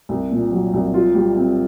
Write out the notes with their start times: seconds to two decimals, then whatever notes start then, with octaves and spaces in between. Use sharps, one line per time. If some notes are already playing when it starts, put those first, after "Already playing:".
0.09 C2
0.31 A#2
0.51 F#3
0.74 C2
0.94 F4
1.15 G3
1.36 C4